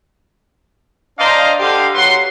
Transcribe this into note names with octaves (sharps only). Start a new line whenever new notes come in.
D4 C5 D5 D#5 F5 A#5
D3 G4 F5
F#3 F#4 B4 C6